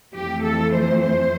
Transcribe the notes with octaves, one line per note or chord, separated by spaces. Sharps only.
F2 E3 A3 G4
A4
C5
C5